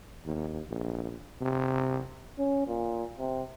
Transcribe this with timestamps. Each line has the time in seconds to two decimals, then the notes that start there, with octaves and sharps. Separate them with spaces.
0.25 D#2
0.70 A#1
1.41 C3
2.38 C#4
2.67 A#2
3.19 C3